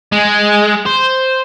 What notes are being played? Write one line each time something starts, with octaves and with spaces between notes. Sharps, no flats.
G#3
C5